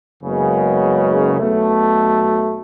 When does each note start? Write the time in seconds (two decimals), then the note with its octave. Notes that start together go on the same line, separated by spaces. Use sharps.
0.21 F#1 F#2 C#3 G#3 B3
1.40 B1 B2 A3